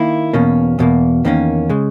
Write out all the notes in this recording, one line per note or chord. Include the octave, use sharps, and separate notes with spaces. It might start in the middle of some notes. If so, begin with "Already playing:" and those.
Already playing: D#3 A#3 E4
E2 B2 A#3 C#4
E2 B2 A#3
E2 D#3 A#3 C#4
C#3 G#3